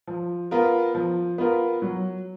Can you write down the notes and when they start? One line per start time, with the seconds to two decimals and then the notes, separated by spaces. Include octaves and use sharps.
0.07 F3
0.51 B3 F4 A#4
0.95 F3
1.38 B3 F4 A#4
1.82 F#3